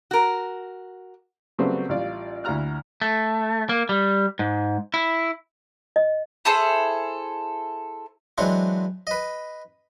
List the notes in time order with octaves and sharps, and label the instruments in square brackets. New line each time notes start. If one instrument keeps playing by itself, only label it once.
[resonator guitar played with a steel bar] F#4 A#4
[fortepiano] C#3 F#3 G3 A3 B3 C4
A1 G3 F4 D5
D2 E4 F#4 A#5 F6 F#6
[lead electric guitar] A3
A#3
G3
G#2
E4
[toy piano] D#5
[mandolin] E4 G#4 A4 C5
[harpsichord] E3 F#3 G#3 C4 D4 F#4
B4 D#5